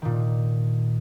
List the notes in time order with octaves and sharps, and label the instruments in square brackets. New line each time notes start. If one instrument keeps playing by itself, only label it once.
[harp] A#2 D#3